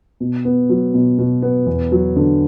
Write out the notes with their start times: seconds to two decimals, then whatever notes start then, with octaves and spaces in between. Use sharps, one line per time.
0.20 B2
0.45 B3
0.70 F#3
0.94 B2
1.19 B2
1.42 B3
1.66 E2
1.92 F#3
2.16 D3